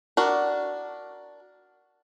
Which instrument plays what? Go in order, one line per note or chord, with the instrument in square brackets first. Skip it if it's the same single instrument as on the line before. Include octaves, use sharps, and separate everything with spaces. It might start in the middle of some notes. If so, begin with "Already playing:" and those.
[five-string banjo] D4 F#4 A#4